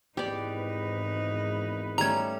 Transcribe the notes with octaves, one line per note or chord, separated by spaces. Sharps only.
G#1 E2 G#2 D#4 G4 B4 D5
G3 A3 C#4 A#5 G#6